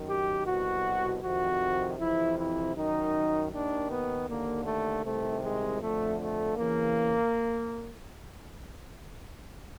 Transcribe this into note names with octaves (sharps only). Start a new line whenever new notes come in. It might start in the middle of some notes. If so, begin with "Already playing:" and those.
Already playing: F#2 D#3
G4
C2 B2 F#4
F2 C3 D#3 F#4
F2 C3 E3 E4
E4
F#2 D#3 D#4
D#2 D#3 D4
B3
D#2 D3 A#3
A3
C2 C3 D#3 A3
G#3
F2 D3 A3
A3
E2 C#3 E3 A#3